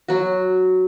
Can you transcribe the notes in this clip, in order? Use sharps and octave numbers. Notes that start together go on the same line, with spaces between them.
F#3 F#4